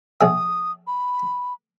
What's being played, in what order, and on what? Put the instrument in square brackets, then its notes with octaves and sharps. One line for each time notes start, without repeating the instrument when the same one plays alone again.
[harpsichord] A#1 G#4 E5 [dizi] D#6
[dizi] B5